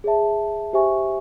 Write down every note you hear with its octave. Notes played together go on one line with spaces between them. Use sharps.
G#4 C#5 E5 A5
G4 C5 E5 G#5 C#6